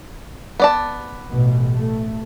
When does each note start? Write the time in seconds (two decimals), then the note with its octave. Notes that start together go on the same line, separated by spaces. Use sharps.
0.60 B3 D5 A5
1.30 A1 B2
1.74 A3